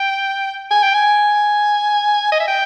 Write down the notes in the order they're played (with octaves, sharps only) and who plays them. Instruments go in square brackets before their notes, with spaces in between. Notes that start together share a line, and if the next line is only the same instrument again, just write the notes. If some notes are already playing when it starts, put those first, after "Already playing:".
Already playing: [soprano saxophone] G5
G#5
G5
G#5
D#5
E5
G5